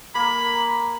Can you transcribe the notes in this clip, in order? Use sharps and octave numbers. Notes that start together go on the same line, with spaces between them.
A#3 A#4 B5